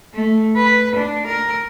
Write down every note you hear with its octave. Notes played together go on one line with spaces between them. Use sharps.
A3
B4
D4
A#4